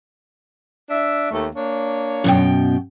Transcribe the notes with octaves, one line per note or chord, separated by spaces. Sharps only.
D4 E5
D#2 A3
A#3 D4 C#5
F#2 B2 G5